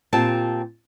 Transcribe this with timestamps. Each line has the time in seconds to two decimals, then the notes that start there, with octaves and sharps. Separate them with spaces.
0.13 A#2 C4 F4 G4 A5